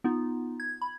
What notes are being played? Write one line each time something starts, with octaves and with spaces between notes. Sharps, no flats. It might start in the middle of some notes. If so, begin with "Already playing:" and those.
B3 D#4 F4
G#6
B5